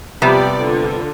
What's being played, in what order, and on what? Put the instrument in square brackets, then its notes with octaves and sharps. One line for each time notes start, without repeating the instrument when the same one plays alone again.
[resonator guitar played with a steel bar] C3 G3 B3 [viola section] F3 G4 D5
[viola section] D3 F4